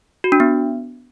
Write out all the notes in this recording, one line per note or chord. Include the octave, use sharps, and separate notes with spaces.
F#4
D4
B3